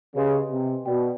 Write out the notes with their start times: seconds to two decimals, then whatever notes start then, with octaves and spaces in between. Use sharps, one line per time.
0.15 C#3 G4 B4 D#5 G#5 C6
0.51 C3
0.86 B2 B4 D5 G5